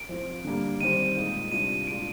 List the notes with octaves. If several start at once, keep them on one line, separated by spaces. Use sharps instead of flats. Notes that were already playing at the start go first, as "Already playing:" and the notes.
Already playing: D7
F3 C4 F4
D3 G3 A#3
D#3 G3 C4 D#7
A#2 G#3 D#4
C3 G3 D4 F4 D#7
A#2 G#3 D4 F4 D7